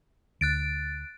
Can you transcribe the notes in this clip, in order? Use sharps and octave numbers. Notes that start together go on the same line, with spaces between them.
D2 F#6 A6 D7